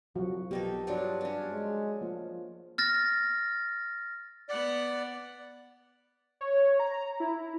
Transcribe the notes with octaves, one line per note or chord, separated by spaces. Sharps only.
C2 F3 F#3 F#4
B1 A#3 B3 D#4 G4 A4
G2 F3 F#3 D4
C#4 D4
G#3
F3 A#3
F6 A6 A#6
B3 D5 F#5
C#5
A#5
E4